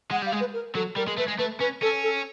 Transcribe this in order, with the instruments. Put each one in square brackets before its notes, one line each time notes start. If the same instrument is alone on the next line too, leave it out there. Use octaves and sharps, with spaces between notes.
[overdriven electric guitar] G#3 [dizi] F#5
[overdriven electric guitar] G3 [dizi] F5
[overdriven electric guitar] G#3
[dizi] B4
A#4
[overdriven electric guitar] F#3 [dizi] A4
[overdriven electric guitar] G3 [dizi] A#4
[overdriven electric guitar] G#3
[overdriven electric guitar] A3 [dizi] B4
[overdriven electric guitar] G#3
[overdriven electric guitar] A3 [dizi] B4
[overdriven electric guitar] C#4 [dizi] B4
[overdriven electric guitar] C#4 [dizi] A4
[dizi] A4